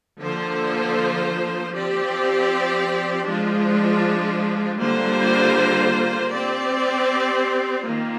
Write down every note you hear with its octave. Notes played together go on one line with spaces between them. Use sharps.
D3 F3 A#3 F4 C5
F3 C4 G4 D5
F3 G#3 D4 F4
D3 G3 A#3 F4 C5
C4 G4 D5
D#3 A#3 F4